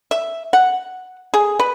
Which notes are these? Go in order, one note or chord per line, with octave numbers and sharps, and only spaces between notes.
E5
F#5
G#4
B4